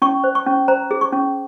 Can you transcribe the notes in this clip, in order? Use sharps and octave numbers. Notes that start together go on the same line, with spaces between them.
C#4 C#6
C5
C#6
C#4
C5 A#5
G#4
C#6
C#4